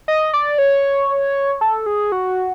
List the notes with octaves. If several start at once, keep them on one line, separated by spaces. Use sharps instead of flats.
D#5
D5
C#5
A4
G#4
F#4